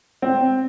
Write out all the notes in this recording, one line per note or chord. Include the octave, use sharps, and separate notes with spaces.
C4